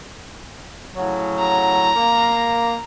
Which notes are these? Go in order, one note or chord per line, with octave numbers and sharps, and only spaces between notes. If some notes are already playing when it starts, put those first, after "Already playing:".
A2 C#3 F#3
A#5
A#3